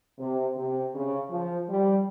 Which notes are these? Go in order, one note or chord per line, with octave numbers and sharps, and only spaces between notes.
C3
C3
C#3
F3
G3